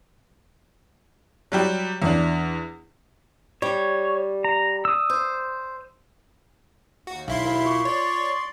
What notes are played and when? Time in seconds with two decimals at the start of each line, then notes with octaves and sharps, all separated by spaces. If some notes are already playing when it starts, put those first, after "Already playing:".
1.52 F#3 G3 G4
2.02 E2 D4
3.62 G3 C#5
4.44 A#5
4.85 D#6 E6
5.10 C5
7.07 D#2 F#4
7.28 B1 E4 F5 C6
7.45 A#4 F5 B5
7.66 F4 C#6 D6
7.85 C#5 D5 C6